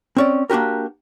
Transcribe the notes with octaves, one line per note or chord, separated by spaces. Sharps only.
C4 C#4 D5
A#3 D4 F#4 G4 A#4